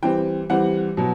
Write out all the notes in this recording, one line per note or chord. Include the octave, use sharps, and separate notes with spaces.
E3 G3 C4 G5
E3 G3 C4 F#5
B2 F#3